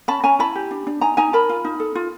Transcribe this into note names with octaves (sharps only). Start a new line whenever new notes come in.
C#4 A5 B5
C#4 G#5 A#5
E4 A5 B5
G4
D4
D4
D#4 G#5 A#5
D#4 G#5 A#5
A#4 A5 B5
F4
D#4
A4
F4